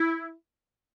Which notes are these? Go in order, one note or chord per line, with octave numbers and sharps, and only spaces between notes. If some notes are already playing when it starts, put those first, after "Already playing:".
Already playing: E4